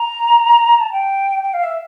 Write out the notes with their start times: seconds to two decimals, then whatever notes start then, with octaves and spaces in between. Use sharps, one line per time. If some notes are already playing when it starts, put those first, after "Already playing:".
Already playing: A#5
0.81 A5
0.92 G5
1.43 G5
1.54 F5
1.63 E5